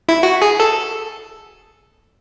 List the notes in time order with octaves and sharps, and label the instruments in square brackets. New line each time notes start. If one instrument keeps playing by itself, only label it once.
[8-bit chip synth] E4
F#4
G#4
A4